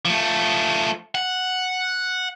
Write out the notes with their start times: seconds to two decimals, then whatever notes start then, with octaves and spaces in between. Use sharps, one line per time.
0.05 F3 A3
1.15 F#5